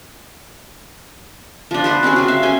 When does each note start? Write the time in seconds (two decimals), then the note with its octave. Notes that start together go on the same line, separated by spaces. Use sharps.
1.71 F3 D4
1.84 B4 C5 F#5
2.03 C4 C#4 F#4 G#4
2.16 F#3 C4
2.28 E5 F5
2.43 C#4 G5 G#5